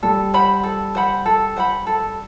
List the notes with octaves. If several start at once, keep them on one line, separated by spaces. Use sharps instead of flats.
G3 A4
C5 F#5 B5
A4
C5 F#5 B5
A4
C5 F#5 B5
A4